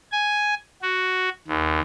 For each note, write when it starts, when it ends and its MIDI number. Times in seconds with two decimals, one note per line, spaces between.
0.12 0.54 80
0.82 1.29 66
1.48 1.80 39